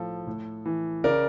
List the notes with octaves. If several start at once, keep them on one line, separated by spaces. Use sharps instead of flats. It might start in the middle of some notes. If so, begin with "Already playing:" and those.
Already playing: A2 F3 A4
A2
E3
C#3 A#4 D5